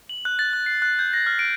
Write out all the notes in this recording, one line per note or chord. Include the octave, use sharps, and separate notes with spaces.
F#7
F#6
A6
F#6
C7
F#6
G6
A#6
F6
D7